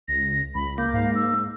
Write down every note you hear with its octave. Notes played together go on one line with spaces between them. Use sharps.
C#2 A#6
C#2 B5
A#3 G6
G#2 F5
E6